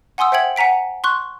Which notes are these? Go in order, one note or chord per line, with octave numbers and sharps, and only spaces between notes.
F#5 G#5 C6 D#6 E6
C5 E5 F#5 G5 G#6 F#7
F#5 G#5 A#5 B6 D7
C6 C#6 F#6